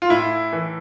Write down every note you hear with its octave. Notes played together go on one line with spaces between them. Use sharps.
F4
A2 E4
E3